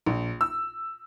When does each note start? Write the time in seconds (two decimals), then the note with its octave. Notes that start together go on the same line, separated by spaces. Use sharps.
0.06 A#1
0.41 E6